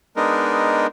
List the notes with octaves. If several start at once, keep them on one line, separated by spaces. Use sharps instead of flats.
G#3 B3 D4 D#4 A#4